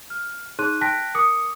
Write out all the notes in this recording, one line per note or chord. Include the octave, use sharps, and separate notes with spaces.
F6
D#4 G#4 C#5 C6 F#6 D#7
G5 A5 F#6 A#6 B6 D7
A#4 D6 D#6 C#7